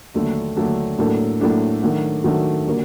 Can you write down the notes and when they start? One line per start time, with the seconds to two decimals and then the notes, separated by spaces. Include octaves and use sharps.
0.14 D#2 D3 F#3 A3 D4
0.56 D#2 D3 F#3 A3 D4
0.98 A2 F#3 A#3 D4 A4
1.40 A2 F#3 A#3 D4 A4
1.82 D#3 F#3 A3 D4 F#4
2.24 D#3 F#3 A3 D4 F#4
2.66 D3 G3 A#3 F#4 A#4